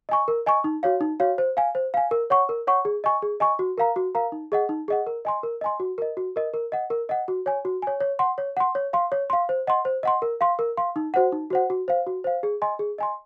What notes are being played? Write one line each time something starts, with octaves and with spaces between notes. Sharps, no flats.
D#5 G#5 C#6
A#4
D#5 G#5 C#6
D#4
F#4 C#5 F5
D#4
F#4 C#5 F5
C5
F5 G#5
C5
F5 G#5
A#4
C#5 F#5 C#6
A#4
C#5 F#5 C#6
G#4
D#5 G#5 C#6
G#4
D#5 G#5 C#6
F#4
A#4 F5 A#5
F#4
A#4 F5 A#5
D#4
G#4 D#5 F#5
D#4
G#4 D#5 F#5
A#4
D#5 G#5 C6
A#4
D#5 G#5 C6
F#4
A#4 D#5
F#4
A#4 D#5
A#4
D#5 F#5
A#4
D#5 F#5
F#4
C#5 G#5
F#4
C#5 G#5
C#5
F#5 C6
C#5
F#5 C6
C#5
F5 C6
C#5
F5 C6
C5
D#5 F#5 C6
C5
D#5 F#5 C6
A#4
F5 C6
A#4
F5 C6
D#4
F#4 C5 F#5
D#4
F#4 C5 F#5
F#4
C5 F5
F#4
C5 F5
G#4
D#5 G#5 C6
G#4
D#5 G#5 C6